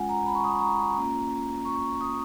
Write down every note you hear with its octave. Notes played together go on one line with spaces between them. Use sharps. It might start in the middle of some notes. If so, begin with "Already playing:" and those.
Already playing: G#3 C#4 F4 F#5 G#5
A#5
B5
C#6
D#6
C#6
A#5
A#3 C#4 F4
C#6
D#6